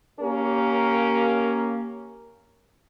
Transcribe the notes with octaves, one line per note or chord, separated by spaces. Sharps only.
A#3 C#4 G4 A#4